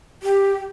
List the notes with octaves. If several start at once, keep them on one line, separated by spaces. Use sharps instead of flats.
G4